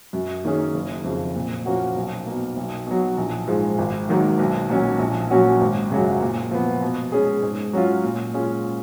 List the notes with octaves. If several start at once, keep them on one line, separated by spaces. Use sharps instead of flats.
F#2
D#3 A#3 C#4 G#4
F#1
F2 C#3
A#2
F3 A#3 C#4 F#4
B1
B2 A#3
B1
B2 F#3
A#1
G#2 F3 G#3
G#1
G#2 D#3 F#3 A#3
B1
A#2 F#3 C#4
A#1
A#2 F#3 C#4 F#4
G#1
F#2 C#3 F#3
A#2
F3 B3
B2
G#3 C#4 G#4
G#2
F#3 C#4 F4
A#2
G#3 C#4 F4 G#4